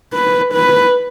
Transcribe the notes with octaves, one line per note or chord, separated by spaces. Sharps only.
B4
B4